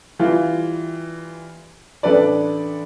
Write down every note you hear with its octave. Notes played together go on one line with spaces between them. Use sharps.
E3 G3 F4
A1 D4 A4 B4 D5